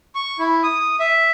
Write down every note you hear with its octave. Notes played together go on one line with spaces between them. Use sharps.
C#6
E4
D#6
E5